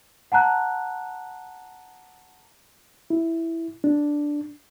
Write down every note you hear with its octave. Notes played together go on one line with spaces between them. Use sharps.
F#5 A5 A#5 F#6
E4
D4